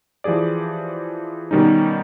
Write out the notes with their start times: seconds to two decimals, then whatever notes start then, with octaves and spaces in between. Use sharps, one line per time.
0.24 E3 F3 G4 G#4 D5
1.51 B2 D#3 G3 C#4 D#4